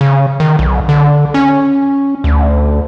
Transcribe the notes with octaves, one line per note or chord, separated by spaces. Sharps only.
C#3
D#3
B1
D3
C#4
D2